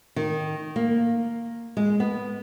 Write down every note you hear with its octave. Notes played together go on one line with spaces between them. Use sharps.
D#3
A#3
G#3
B3